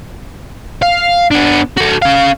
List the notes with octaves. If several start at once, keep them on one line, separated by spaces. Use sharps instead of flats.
F5
B3 D4
F#4 A4
C#4 F5